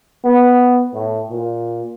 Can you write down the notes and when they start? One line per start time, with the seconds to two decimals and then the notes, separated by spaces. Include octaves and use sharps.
0.24 B3
0.93 A2
1.30 A#2